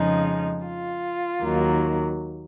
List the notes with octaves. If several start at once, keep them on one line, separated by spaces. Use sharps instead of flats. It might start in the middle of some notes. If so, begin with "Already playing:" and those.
Already playing: F2 C#3 F3 G#3 D#4
F4
D#2 D#3 F#3 A#3